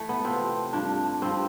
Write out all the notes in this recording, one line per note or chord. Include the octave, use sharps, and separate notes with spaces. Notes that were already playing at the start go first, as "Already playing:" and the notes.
Already playing: E3 A3
B3
C3 F3 C4
G2 F3 D4
G2 F3 C4